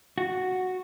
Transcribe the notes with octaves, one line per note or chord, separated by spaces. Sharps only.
F#4